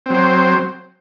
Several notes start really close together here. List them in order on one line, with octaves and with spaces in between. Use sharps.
C4 F#3 C5